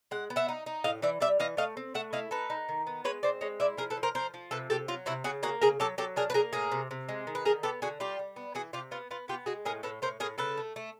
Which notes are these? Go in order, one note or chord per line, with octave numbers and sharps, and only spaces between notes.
G#3 F#5
B3
E5 F#5
D#4
D#4
A2 D#5 F5
E3 D5 E5
G3 D5 E5
E3 D#5 F5
A3 D#5 F5
C4
A3 E5 F#5
E4 D#5 F5
D#4 A4 B4
D#4
D#3
B3
G#3 B4 C#5
C4 C5 D5
G#3 C#5 D#5
E4 D5 E5
F3 G#4 A#4
A4 B4
F3
A#4 C5
F3 A#4 C5
F3
C3 A4 B4
C3 G4 A4
F#3 F4
C3 E4 F#4
C#3 F#4 G#4
A#3 F#4 G#4
C#3 G#4 A#4
F#3 G4 A4
F#3 G4 A4
D4 G#4 A#4
B4
A#3 G#4 A#4
A2 G#4 A#4
C3
C3
G#3
D#3
B4
D3 G#4 A#4
B3 G4 A4
D3 F#4 G#4
G3 F4 G4
G3
B3
E3 F#4 G#4
C3 F4 G4
B3 F4
B3 F4
B3 F4 G4
G#3 F#4 G#4
A2 G#4 A#4
A2 A4 B4
A2 A#4 C5
A2 G#4 A#4
C#3 A4 B4
A3
A3